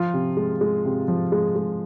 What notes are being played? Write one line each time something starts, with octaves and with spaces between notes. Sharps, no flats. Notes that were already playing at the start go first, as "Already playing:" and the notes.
Already playing: F3 F4
C3
G#3
G#3
C3
F3
G#3
G#3